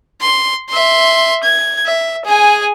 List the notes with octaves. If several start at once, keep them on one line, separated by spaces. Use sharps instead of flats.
C6
E5 C6
G#6
E5
G#4 G#5